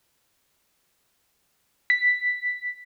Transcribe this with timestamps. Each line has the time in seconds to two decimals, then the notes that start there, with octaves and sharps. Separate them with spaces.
1.90 B6